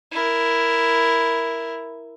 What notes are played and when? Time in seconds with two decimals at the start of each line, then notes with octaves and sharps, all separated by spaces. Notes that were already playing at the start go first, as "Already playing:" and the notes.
0.11 E4 A#4